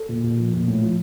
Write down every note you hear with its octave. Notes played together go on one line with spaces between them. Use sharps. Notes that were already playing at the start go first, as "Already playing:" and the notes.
Already playing: A4
A#2
A#2
F3
A#2
A2
F3